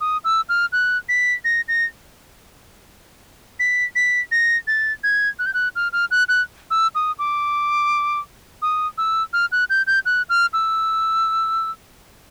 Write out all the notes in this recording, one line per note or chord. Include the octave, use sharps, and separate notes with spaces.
D#6
E6
F6
F#6
B6
A#6
A#6
B6
B6
A#6
A6
G#6
F#6
G6
F#6
F6
F6
F#6
F#6
E6
D#6
D6
D#6
E6
F6
F#6
G6
G6
F#6
F6
E6